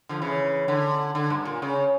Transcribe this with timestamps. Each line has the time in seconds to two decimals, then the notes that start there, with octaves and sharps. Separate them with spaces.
0.09 D3 F3
0.22 C#3 E3
0.68 D3
1.15 D3
1.30 G2
1.45 A#2
1.62 C#3